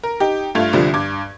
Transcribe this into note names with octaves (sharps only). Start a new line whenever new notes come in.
A#4
D#4 G4
G2 A3 F4 G#6 F7
C2 D3 F3 G3
G2 D6 G#6